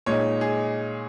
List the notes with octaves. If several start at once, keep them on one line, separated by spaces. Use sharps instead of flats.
A#2 G#3 D#4 C#5
G#4